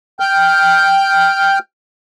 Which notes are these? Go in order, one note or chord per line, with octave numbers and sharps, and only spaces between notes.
G5 F6 G6